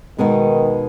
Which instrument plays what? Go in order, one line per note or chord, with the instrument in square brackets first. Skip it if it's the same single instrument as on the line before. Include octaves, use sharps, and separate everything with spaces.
[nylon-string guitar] B2 G#3 B3 D#4 [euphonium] D#3